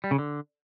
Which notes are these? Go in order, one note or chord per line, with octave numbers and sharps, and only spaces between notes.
G3
C#3
D3